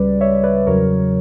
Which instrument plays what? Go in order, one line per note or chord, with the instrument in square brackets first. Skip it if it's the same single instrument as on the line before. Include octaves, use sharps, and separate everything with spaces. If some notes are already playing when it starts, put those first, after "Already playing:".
Already playing: [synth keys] C#2 C#3 G3 B4 D5
C#5 E5
B4 D5
E2 C#3 F#3 A#4 C#5